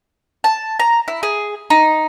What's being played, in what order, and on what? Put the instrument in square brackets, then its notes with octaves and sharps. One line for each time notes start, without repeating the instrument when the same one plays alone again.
[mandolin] A5
A#5
E4
G#4
D#4